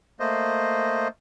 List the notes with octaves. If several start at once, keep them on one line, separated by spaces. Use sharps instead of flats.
A3 A#3 C5 D#5